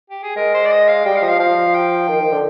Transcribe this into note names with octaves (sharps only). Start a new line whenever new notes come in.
G4
G#4
G#3 A#4
C5
D5
D#5
F5
G3 G5
F5
F3 D#5
F5
F3 F5
G5
D#3
D#3
D3